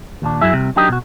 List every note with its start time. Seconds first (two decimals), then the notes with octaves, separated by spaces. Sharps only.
0.22 D#2 A#2 D4
0.41 F#2 F#3 E4 G#4 E5
0.53 C2 C3
0.76 F#3 D4 D#4 G4 A#4 D#5
0.89 B2 F#4